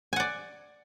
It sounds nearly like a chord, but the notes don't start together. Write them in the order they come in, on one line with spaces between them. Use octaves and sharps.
G#5 F#5 D5